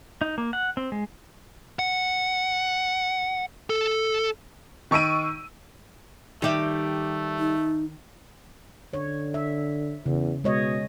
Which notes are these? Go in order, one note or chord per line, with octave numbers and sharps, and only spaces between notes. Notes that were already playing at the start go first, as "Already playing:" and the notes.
D#4
A#3
F#5
C4
G#3
F#5
A4
D#3 C#6 E6 D7 D#7
D#3 G3 A3 G4 E5
D#4
D3 C#5
E5
E2 C#3
B2 G#3 C#5 D#5